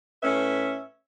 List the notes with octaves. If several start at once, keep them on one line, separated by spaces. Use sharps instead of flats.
A2 C#4 B4 E5